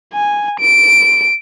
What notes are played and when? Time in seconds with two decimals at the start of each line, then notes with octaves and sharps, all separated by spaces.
0.14 G#5
0.60 D7